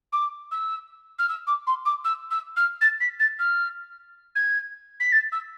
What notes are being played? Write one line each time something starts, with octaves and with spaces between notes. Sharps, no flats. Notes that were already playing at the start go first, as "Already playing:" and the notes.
D6
E6
F6
E6
D6
C6
D6
E6
E6
F6
A6
B6
A6
F6
G#6
B6
A6
E6